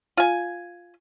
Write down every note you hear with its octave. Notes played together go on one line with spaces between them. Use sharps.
F4 G#5